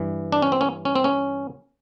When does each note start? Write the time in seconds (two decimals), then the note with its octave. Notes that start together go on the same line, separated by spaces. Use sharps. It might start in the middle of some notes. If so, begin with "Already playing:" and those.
Already playing: G2 E3
0.32 D4
0.42 C#4
0.52 C4
0.61 C#4
0.85 C#4
0.96 C4
1.04 C#4